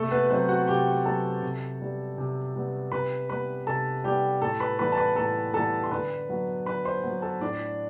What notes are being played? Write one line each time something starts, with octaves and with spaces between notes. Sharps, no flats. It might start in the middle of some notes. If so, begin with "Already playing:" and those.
Already playing: C3 A3 A4
B3 B4
B4
F#3 B3 C4 C5
F#4 F#5
C3 G4 G5
F#3 B3 A4 A5
C3
G3 B3
C3
G3 B3
C3 B4 B5
G3 B3 B4 B5
C3 A4 A5
G3 B3 G4 G5
A2 A4 A5
B4 B5
E3 G3 B3 B4 B5
A5
B4 B5
A2 A4 A5
E3 G3 B3 A4 A5
C6
D3 B4 B5
F#3 B3
D3 B4 B5
C5 C6
F#3 B3
A4 A5
A2 D4 D5